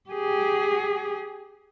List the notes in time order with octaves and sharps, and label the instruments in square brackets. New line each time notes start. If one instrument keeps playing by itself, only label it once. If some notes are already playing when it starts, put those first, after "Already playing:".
[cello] G4 G#4